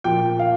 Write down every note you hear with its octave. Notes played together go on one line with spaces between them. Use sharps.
A#2 F3 G5
F5